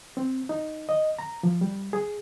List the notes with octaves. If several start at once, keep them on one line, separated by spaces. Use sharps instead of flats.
C4
D#4
D#5
A#5
F3
G3
G#4